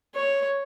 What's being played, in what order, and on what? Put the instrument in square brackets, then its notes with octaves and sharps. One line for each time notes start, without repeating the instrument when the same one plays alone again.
[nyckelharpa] C#5